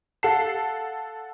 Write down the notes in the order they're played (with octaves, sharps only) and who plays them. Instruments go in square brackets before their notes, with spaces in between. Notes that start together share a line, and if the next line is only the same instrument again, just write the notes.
[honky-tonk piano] A4 F#5 C7 [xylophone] F5 A5